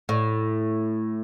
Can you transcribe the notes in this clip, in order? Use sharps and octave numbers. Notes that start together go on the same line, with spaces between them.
A2